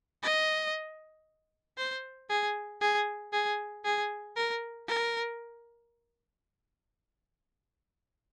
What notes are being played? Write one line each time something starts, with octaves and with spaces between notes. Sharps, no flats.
D#5
C5
G#4
G#4
G#4
G#4
A#4
A#4